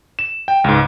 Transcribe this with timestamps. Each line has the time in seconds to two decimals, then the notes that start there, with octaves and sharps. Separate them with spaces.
0.19 E7
0.48 G5
0.64 C#2 G#2